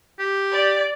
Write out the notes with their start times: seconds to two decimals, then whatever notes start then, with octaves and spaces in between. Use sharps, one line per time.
0.19 G4
0.52 D5